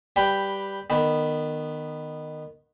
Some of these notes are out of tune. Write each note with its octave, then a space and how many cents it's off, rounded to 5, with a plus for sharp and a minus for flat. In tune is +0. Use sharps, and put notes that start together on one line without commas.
G3 +0 B4 +0 G5 +0
D#3 -20 B3 +0